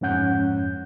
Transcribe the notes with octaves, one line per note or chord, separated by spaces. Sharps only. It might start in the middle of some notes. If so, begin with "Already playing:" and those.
F2 G#2 C#4 F#5 G6